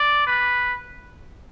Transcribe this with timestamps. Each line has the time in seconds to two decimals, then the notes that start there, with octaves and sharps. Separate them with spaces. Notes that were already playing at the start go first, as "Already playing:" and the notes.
Already playing: D5
0.27 B4